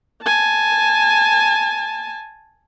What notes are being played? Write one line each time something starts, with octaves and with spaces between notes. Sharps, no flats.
G#5 A5